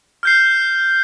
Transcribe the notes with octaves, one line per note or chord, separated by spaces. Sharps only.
F6 G6 C7